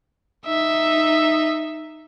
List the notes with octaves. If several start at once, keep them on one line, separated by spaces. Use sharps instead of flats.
D#4 E5